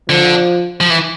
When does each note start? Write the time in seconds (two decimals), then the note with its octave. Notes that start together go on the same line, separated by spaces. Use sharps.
0.09 D3 F3
0.81 F3
0.90 E3